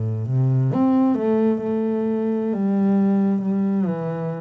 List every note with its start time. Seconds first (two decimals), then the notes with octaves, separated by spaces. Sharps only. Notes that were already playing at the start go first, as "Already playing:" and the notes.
Already playing: A2
0.29 C3
0.73 C4
1.18 A3
1.63 A3
2.53 G3
3.42 G3
3.87 E3